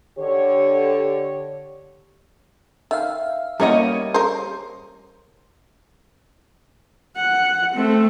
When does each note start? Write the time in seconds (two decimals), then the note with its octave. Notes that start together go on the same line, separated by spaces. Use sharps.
0.18 D3 G4 C#5
2.91 D#3 E5 F5
3.60 G3 A#3 B3 C#4 E4 A#4 C#5 D#5
4.14 A#4 C5
7.17 F#5
7.74 A3 C4